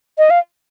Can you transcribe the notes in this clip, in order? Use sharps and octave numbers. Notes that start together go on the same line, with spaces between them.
D#5
F5